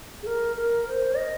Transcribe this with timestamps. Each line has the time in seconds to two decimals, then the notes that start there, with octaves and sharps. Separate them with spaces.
0.22 G#4
0.26 A#4
0.56 A#4
0.87 C5
1.17 D#5